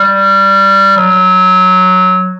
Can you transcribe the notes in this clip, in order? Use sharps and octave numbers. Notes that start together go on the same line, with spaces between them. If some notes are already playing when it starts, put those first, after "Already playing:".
Already playing: G3
F#3